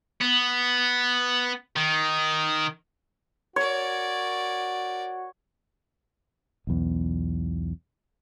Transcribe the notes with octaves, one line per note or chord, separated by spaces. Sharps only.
B3
D#3
F#4 A#4 C#5 D5
B1 E2